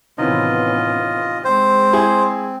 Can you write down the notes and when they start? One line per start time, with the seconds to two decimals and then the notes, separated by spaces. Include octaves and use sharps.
0.18 A2 C3 D#3 E3 B3 C#4 F4 D#5
1.44 G#3 C4 C5
1.93 E4 G#4 C6